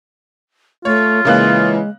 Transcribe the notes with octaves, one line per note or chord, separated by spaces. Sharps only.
A3 F4 C#5
C#3 E3 G#3 A#3 F#6